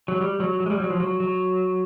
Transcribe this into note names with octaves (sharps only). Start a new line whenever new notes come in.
F#3
G3
F#3
F#3
G#3
G3
F#3
F3
F#3
F#3